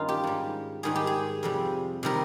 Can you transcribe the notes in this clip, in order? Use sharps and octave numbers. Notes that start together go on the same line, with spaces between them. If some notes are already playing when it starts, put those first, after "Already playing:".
Already playing: G2 D#3 G3 C#4 D#4 F4
G4
G#2 G3
G#2 D#3 G3 G#4
G4
G#4
F2 C3 G3
C3 D#3 G3 A#4